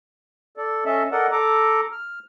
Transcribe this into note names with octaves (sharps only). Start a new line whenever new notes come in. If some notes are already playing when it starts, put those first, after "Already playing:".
A4 D5
C#4 A4 D#5 E5 A5
A4 A#4 D5 D#5 F#5
A4 A#5 D6
F6